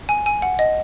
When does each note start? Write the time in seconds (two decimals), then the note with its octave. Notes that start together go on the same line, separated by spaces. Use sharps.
0.09 G#5
0.26 G#5
0.42 F#5
0.59 D#5